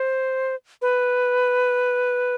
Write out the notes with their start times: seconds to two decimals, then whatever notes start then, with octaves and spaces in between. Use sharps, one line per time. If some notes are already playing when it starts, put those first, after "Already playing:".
Already playing: C5
0.82 B4